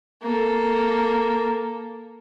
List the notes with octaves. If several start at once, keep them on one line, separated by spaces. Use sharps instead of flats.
A#3 A4